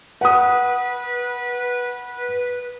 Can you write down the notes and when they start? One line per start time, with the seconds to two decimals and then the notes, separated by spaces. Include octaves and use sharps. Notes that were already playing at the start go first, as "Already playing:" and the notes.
0.21 B4 F#5 D#6